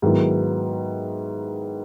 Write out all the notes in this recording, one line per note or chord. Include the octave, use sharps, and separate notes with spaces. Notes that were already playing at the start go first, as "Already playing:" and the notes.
G#2 D#3 F#3 B3 E4